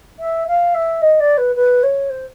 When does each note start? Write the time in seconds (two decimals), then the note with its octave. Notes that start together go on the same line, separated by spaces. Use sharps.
0.19 E5
0.47 F5
0.74 E5
1.01 D#5
1.19 D5
1.37 B4
1.55 B4
1.83 C#5
2.09 C5